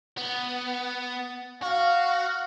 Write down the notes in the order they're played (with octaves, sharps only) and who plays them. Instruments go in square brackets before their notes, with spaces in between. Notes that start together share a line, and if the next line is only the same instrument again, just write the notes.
[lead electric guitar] B3
[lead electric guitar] F#4 [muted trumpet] F5